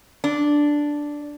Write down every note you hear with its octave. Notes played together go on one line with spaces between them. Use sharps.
D4